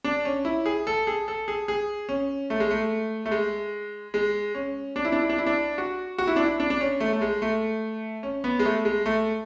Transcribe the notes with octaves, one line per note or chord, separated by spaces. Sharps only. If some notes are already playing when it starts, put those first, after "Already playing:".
D4
C#4
E4
G#4
A4
G#4
A4
G#4
G#4
C#4
A3
G#3
A3
A3
G#3
G#3
C#4
D4
E4
D4
E4
D4
E4
D4
F#4
F#4
E4
D4
E4
D4
D4
C#4
A3
A3
G#3
A3
C#4
B3
G#3
A3
G#3
A3